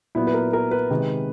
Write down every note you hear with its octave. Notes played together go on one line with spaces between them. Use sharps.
A#2 F#3 B3 E4
B4
A#4
A#4
B4
C3 D#3 G#3